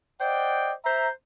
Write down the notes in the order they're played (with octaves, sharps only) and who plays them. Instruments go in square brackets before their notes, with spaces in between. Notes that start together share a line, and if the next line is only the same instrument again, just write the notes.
[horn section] C5 D5 D#5 F#5 G5
C5 E5 A#5